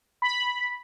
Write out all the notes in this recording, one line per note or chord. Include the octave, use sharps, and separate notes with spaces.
B5